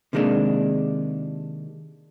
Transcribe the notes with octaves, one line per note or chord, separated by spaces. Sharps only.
C3 D#3 G#3 A#3 D4